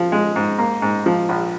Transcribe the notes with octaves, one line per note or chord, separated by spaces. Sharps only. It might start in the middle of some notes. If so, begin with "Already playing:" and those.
Already playing: F3
G#3
G#2
A#3
G#2
F3
A#1